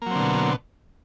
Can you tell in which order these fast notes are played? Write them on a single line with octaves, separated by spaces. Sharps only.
A#3 F#3 C4 D3 B2